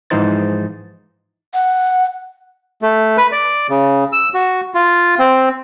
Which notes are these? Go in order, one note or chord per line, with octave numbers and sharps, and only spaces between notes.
G#2 E3 F3 D#4 C5 A6
F#5
A3
B4
D5
C#3
E6
F#4
F4
C4